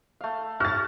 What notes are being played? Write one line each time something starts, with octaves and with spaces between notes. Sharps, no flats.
A3 F5
F#4 F6 A6